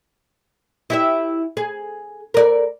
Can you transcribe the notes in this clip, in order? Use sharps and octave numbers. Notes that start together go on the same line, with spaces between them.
E4 G4 E5
G#4
A#4 D5